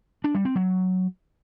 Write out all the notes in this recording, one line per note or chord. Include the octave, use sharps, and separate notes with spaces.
D4
G3
C4
F#3